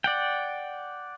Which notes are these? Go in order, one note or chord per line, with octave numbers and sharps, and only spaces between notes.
D5 F#5 G5